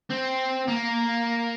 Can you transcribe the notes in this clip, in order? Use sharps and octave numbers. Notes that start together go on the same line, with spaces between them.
C4
A#3